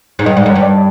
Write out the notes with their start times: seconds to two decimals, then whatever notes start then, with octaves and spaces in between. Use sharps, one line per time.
0.19 G#2
0.26 G2 D#5
0.37 G#2 D5
0.46 F#2
0.50 C#5
0.55 G2
0.62 D5